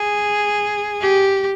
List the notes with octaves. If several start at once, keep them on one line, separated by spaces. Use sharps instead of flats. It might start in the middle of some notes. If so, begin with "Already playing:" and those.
Already playing: G#4
G4